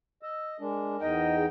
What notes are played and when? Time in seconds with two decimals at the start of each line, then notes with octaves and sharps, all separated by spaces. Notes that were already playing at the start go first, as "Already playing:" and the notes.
0.23 D#5 E6
0.60 G#3 D4 A#4
1.01 E2 D#4 D#5 G5
1.35 G#4